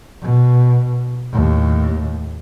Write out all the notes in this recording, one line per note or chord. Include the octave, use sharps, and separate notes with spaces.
B2
D#2 A2